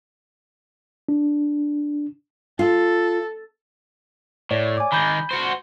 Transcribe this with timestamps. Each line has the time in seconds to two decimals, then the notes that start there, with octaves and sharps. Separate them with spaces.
1.09 D4
2.59 F4 A4
4.51 A2 C#5 D5
4.77 G#5 D6
4.92 D#3 G#3 B5 G6
5.31 F#4 C5